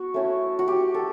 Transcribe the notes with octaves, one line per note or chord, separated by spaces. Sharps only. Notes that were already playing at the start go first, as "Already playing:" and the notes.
Already playing: B3 F#4
A3 C#4 E4
F#4
G4
A4